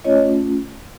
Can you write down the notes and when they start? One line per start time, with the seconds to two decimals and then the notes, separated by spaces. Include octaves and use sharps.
0.04 A3 C#4 F4 C#5 D#5